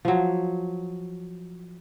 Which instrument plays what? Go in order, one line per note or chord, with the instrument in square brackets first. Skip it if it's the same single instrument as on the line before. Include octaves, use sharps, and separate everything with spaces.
[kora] F3 F#3